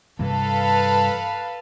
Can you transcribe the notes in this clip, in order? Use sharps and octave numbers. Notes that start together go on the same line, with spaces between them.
G2 C3 E3 A4 B4 F5